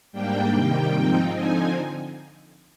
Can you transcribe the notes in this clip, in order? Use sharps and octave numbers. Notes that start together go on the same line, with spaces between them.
G#2 G3 A#3 D4 G5
C3 D#3 G3 A#3
G#2 F3 C4 D#4
D3 F3 C4 D#4 G#5